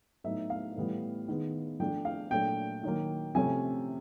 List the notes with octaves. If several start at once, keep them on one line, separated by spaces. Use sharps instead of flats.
A2 F#3 B3 D#4 E5
F5
A2 E3 G3 B3
D#3 G#3 B3
F3 A3 D4 G5
F5
A#2 F#3 A3 D4 G5
D#3 F#3 A#3
C3 F3 A3 C#4 G#5